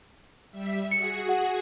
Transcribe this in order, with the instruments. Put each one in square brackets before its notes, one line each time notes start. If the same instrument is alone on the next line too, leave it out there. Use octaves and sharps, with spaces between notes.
[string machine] G3 E5 B6
[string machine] F#4 G#4 [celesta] C#7
[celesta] F#5